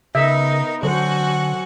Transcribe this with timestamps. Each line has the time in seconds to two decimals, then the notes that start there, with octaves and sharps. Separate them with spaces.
0.15 C#3 B3 D#4 A#4 E5
0.83 D3 F#3 F#4 A4 C5 F#5 G#5